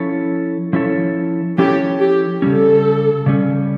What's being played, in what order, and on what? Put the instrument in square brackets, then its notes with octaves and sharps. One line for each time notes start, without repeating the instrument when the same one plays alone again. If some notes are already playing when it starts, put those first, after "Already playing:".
Already playing: [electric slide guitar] F3 C#4 E4 A4 C#5
F3 C#4 E4 A4 C#5
[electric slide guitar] F3 C#4 E4 A4 C#5 [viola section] G4
[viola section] G4
[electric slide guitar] C#3 G3 C#4 [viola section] A4
[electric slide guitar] C#3 G3 C#4